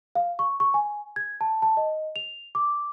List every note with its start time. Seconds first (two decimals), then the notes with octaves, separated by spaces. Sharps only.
0.15 F5
0.39 C#6
0.60 C#6
0.74 G#5
1.16 G#6
1.41 A5
1.62 A5
1.77 D#5
2.16 F7
2.55 D6